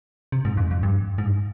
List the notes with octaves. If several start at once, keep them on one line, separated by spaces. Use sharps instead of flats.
C3
G#2
F2
F2
G2
G#2
G2